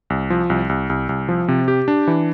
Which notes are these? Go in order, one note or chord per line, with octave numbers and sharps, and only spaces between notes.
C2
F3
C2
C2
C2
C2
F3
C3
G4
D4
E3